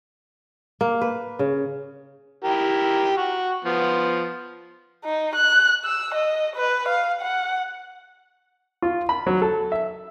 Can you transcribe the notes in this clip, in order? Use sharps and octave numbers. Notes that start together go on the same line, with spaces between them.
A#3
B4
C#3
E4 G4 A#4
F#4
F3 B3
D#4
F#6
E6
D#5
B4
F5
F#5
F4
B5
F#3
A4
E5